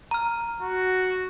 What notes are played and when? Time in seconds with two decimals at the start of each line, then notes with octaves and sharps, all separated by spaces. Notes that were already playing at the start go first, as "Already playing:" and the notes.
0.11 A#5 F6
0.61 F#4